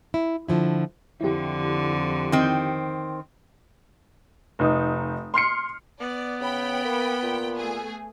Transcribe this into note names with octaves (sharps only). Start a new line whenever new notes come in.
E4
D3 F3 E4
F2 D3 E4 G4
D#3 C4
F1 D#4 D#6
C6 F6 C7 C#7
B3 D5
C#3 G5 B5
A#3
A#2
A3 G#4